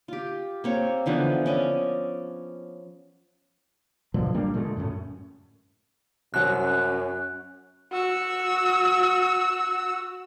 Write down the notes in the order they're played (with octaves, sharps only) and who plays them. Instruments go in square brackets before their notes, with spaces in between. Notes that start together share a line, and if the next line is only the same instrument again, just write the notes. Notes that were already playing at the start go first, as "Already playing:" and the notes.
[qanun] F4 G4
A#3 C4 C#5
D3 E3 F3 B3
C#4 D5 D#5
[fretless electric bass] B2 D3 F3 F#3
A1 G3 A#3 D4
A#2 D3 G#3 A3
F#2 A2 A#3 C#4
[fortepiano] C2 F#3 [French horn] F#2 [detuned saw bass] C#4 [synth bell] F#6
[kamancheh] F#4 E6